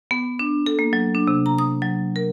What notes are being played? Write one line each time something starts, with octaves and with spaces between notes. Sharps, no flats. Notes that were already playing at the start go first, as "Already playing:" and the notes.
B3
D4
A4
A#3
F#3
D4
C3
A#5
D#6
F#3
A#4